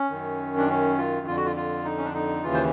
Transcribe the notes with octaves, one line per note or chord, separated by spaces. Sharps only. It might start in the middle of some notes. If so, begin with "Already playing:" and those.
Already playing: C#4
F#2 D#3
D4
C#4
F4
F2 D3 F4
F#4
F4
F4
D#4
C#4
D4
D#4
D#2 C#3 E3 F4
C5